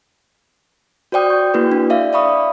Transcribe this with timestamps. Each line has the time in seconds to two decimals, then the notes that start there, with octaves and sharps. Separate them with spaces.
1.12 F#4 C5 D5 G5 D#6
1.30 C#6 G6
1.54 A#3 E4 F#4 G#4 B4
1.72 D4
1.90 D5 E5 F5
2.13 D5 E5 F5 B5 C#6 D#6